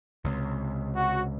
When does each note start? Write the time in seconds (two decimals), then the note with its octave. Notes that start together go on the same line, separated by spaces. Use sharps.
0.24 C#2 C3
0.96 F#4